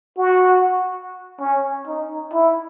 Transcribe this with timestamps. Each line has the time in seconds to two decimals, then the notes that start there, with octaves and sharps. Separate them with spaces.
0.18 F#4
1.40 C#4
1.87 D#4
2.33 E4